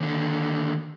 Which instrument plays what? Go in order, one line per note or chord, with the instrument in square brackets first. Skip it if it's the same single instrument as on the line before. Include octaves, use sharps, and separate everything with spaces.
[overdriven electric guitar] D#2 D3